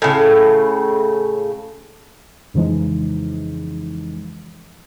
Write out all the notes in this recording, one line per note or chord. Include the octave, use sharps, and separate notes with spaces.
A2 C#3
F2 C#3 E3 F3 G#3 D#4